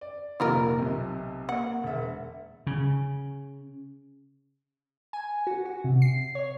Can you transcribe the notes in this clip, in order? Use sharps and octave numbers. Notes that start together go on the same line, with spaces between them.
D5
F1 A#2 G3 F4 A#4
B1 C3
A#3 F#5
E1 E5
C#3
G#5
F#4
F#4
C3
C7
C#5